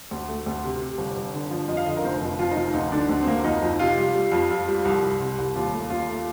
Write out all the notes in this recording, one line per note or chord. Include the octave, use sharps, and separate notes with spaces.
D2
A3
D2
C3
C3
G1
G1
D3
F3
F2 D#5
F5
D3 D#5
A#4
F1 C5
F2
F2 F4
D#4
F1 F4
D2 D#4
D3 D4
D2
C4
D2 A#3
F2 D#4
F2
C3 F4
G3
G3
F2
F2
G3
C2
C2
C3
C2
D#2 F4
A3
D#2 F4
A3